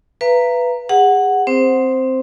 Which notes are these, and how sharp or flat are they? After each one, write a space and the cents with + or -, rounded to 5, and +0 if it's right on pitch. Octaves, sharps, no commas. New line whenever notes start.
B4 +0 F5 -45 A#5 +0
G#4 -35 F#5 +0
C4 +0 C5 +0